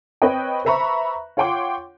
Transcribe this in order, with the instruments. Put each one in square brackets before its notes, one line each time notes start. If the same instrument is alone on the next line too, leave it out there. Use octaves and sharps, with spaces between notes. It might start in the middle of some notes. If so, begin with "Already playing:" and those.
[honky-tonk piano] C4 B4 C#5 D#5 G5
B4 C5 E5 A#5 B5 C#6
F4 C#5 F#5 G5 C6 D6